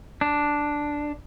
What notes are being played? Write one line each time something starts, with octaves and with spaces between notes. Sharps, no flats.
D4